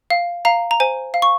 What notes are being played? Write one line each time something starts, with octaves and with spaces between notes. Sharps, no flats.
F5
F5 A#5
A#5
C5 G#5
F5
C#6